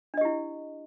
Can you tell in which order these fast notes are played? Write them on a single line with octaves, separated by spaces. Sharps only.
D4 D#5 G4 E4